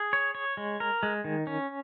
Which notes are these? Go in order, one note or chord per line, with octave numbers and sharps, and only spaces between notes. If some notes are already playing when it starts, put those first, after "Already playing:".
Already playing: G#4
C#5
C#5
G#3
A#4
G#3
D#3
C#4